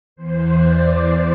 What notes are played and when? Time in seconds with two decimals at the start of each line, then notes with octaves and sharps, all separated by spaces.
0.16 E2 E3 C5
0.60 D5